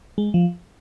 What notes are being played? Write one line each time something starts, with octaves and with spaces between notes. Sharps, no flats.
G#3
F3